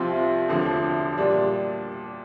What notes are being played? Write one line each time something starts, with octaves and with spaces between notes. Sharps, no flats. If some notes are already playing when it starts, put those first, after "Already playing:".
Already playing: C2 C3 F3 C4 F4
E1 D2 D3 F3
A#2 G3 D4